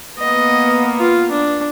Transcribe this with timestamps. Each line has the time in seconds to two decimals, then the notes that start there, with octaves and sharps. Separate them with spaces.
0.19 A#3 B3 D#5
0.99 F4
1.31 D4